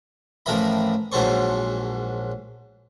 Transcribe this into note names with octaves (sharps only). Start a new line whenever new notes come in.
A1 A2 F3 A#4 E5 B5
A#1 G#2 F#3 A4 C5 C#6